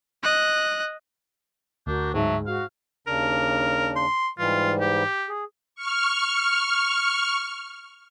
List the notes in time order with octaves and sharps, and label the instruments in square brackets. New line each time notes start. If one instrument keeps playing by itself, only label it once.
[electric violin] D#5 F#6
[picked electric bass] D2 [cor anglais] D4 [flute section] F#4 A#4 G6
[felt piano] G#2 G#3 [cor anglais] F#3 [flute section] E5 A5 C#6
[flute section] F#4 [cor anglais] F5
[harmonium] D#2 C#3 D4 [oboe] A#4
[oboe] C6
[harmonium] G#2 E3 G3 [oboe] F4
[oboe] G4
[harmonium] G#4
[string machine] C#6 F6